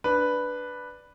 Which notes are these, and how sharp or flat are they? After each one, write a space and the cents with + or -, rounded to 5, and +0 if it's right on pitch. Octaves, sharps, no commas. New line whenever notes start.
D4 +0 B4 +0